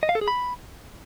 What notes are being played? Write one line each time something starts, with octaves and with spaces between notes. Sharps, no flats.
D#5
F5
A4
G#4
B5